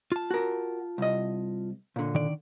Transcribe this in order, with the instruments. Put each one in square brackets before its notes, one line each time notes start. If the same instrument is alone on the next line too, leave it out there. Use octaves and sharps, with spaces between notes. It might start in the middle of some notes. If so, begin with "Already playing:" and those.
[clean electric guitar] F4 A5
[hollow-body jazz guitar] F#4 A#4
C2 D#5
A#2 D3
[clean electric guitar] D#3 D5